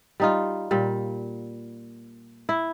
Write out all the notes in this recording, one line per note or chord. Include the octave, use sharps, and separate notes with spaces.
G3 D#4 F4
A#2 G3
E4